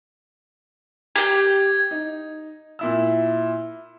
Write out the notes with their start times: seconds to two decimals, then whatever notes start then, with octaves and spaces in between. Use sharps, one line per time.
1.16 G4 G6 G#6
1.91 D#4
2.79 A#2 E4 E6